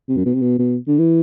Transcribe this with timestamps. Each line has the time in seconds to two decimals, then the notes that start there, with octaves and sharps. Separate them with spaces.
0.09 C3
0.17 F#2
0.25 B2
0.34 C3
0.42 B2
0.59 B2
0.88 D3
0.99 E3